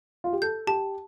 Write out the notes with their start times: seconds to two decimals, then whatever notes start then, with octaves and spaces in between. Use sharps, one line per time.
0.24 F4
0.33 G4
0.42 A4 G6
0.67 G4 A5